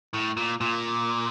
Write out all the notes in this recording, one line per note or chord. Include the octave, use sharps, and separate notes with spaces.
A2
A#2
A#2